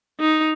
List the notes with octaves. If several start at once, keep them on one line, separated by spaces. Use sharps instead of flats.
D#4